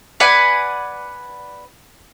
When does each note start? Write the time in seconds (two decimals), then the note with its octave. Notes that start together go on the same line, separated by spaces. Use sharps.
0.20 B4 D5 F#5 G#5